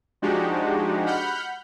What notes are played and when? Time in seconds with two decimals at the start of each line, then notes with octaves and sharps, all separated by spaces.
0.22 F3 G#3 D4 D#4 F#4 G4
1.06 F#5 B5 F6 G6